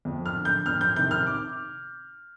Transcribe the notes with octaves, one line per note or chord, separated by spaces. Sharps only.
F2
F6
D3
G6
F2 F6
G6
C3 D#3 G6
F6
D6